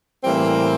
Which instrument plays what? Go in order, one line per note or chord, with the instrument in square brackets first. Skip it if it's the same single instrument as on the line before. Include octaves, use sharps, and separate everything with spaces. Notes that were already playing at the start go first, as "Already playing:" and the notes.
[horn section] A2 E3 G3 A#3 C4